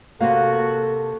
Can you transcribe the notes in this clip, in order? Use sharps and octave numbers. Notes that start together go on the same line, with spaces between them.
C3 A#3 F#4 A4 F5